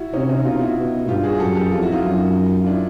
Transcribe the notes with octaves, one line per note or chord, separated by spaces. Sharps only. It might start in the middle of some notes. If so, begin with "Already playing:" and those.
Already playing: E4 F#4
C3 C#4 D#4
C#4 D#4
B2 D#4 F4
E4 F#4
B2
G2 F4 G4
F#4 G#4
G#4
F#2 G4 A4
G4 A4
F2 F4 G4
E4 F#4
D#4 F4
F#2
F4
D4 E4